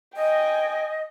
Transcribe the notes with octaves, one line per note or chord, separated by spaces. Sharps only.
D#5 G5 G#5